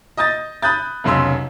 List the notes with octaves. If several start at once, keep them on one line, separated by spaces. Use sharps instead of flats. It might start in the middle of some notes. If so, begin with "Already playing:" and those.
D#5 D#6 G6 A6
B5 D#6 F#6 G6 A6
F1 B1 C#3 C6 E6